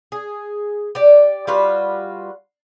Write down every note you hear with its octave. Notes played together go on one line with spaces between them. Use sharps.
G#4
G4 D5
G3 F4 F#4 B4